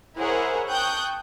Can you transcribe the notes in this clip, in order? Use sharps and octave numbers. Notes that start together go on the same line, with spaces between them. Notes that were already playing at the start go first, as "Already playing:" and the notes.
E4 G#4 A#4 C5 C#5 F#5
G5 A5 C#6 D#6 F#6 G6